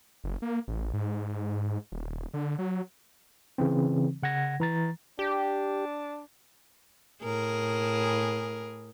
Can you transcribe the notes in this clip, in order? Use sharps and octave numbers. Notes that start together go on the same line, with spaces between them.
F#1
A#3
A1
G#2
D#1
D3
F#3
C#3 E3 C4
C#3 F#5 G#6 A#6
E3 A#5 A6
D4 G4
A2 G#4 A#4